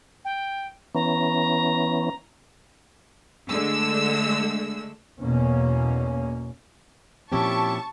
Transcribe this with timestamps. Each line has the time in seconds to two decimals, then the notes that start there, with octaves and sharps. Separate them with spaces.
0.25 G5
0.95 E3 B3 C#4 A#5
3.50 D3 G#3 A3 E6
5.21 E2 B2 A#3 C#4
7.32 A#2 F3 C4 C#4 E4 G4 A5 C#6